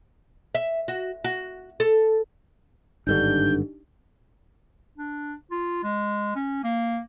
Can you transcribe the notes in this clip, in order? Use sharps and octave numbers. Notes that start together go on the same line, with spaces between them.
E5
F#4
F#4
A4
G#1 G2 D3 D4 D#4 G4 G6
D4
F4
G#3
C#4
A#3